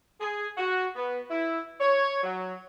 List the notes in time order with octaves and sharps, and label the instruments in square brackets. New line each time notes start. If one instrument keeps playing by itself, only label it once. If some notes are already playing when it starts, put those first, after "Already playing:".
[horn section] G#4
F#4
B3
E4
C#5
F#3